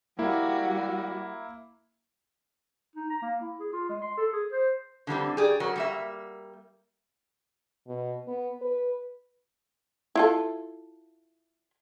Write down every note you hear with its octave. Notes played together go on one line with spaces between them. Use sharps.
G3 A#3 E4 F#4
D#4
A#5
A#3
E4
G#4
F4
G#3
C6
A4
G#4
C5
D3 E3 G3 C4
G4 G#4 D5
F#3 A#4
G3 A#3 E5
B2
B3
B4
E4 F4 A4